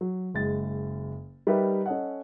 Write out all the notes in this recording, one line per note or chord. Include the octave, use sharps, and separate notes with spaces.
F#3
F#1 G#3 A6
G3 D#4 G4 A#4 B4 E5
C#4 A4 D#5 F#5